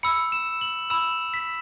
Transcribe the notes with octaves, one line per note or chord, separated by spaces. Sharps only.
B5 E6 C#7
E7
F#7
B5 E6 E7
B6